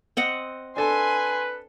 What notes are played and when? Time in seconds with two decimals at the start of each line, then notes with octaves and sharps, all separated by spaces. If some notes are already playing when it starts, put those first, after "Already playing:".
0.17 C4 D#5 F#5
0.77 D4 A4 B4 G#5 C6